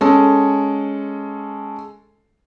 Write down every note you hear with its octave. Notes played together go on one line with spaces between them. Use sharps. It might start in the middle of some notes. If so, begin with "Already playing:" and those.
G#3 C#4 A4